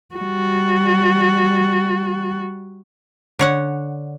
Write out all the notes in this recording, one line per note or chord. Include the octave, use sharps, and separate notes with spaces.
G3 F#4
D3 C#5 F#5